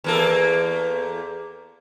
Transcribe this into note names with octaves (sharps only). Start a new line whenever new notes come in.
E2 A#3 A4